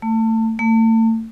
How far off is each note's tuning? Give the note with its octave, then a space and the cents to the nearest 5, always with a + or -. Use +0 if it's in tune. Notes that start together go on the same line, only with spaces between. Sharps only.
A3 +25
A3 +35